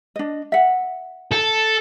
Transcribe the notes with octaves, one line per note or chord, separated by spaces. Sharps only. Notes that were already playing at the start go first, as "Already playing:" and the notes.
D4 D#5
E5 F#5
A4